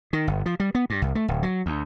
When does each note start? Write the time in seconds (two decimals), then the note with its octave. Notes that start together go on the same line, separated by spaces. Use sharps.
0.13 D#3
0.27 G1
0.46 F3
0.60 G3
0.75 B3
0.90 G2
1.02 C2
1.15 A3
1.28 D1
1.43 F#3
1.66 D2